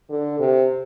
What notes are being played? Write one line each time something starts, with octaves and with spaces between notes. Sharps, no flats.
D3
C3